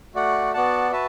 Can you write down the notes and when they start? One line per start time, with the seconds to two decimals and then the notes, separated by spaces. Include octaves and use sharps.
0.15 A3 F#4 D5 F#5
0.54 B3 F#4 D5 F#5 A5
0.91 F#4 B4 E5 A5